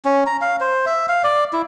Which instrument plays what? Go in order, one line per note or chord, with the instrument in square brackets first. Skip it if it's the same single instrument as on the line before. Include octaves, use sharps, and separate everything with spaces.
[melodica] C#4
A#5
F5
C5
E5
F5
D5
E4